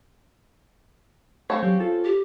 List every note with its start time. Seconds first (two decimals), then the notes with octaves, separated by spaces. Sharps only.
1.50 A3 C4 C#4 C#5 F5
1.63 F#3 G4
1.80 F4 A4
2.04 G4